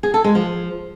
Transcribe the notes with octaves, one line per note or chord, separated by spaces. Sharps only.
G#4
A4
G#3
F3